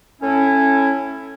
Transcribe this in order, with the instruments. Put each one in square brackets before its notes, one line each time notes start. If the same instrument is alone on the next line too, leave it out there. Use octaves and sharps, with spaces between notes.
[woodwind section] A2 C#4 E4